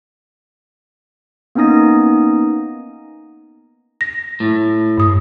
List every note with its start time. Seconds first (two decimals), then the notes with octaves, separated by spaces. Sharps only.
1.55 A#3 B3 C#4 D#4 D#6 A#6
4.01 A#6
4.40 A2
4.98 G2 D#6